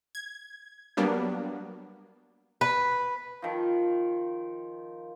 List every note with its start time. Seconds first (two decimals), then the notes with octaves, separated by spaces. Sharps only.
0.15 G#6
0.97 F#3 G3 A#3 B3 D4
2.61 B4
3.42 D#3 F3